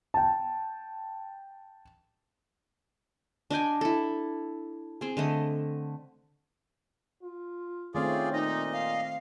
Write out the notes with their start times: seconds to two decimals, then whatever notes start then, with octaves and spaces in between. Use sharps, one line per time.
0.14 G5 A5
3.50 D4 D#5 G5 G#5
3.81 E4 A4
5.01 C4 G#4
5.17 D3 A3 D#5
7.22 F4
7.95 D#3 A3 C4 C#4 F4 G#4 D5
8.33 A#2 D#4 D#5
8.73 F5